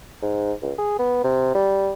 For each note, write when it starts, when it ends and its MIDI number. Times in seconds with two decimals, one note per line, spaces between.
0.22 0.53 44
0.62 0.73 37
0.78 0.96 68
0.99 1.19 59
1.24 1.51 48
1.55 1.93 55